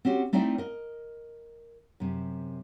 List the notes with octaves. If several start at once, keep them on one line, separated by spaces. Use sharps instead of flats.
C4 C#4 F#4 G4
A3 C4 D#4 E4 D5 G5
A#4 D#5
F#2 C3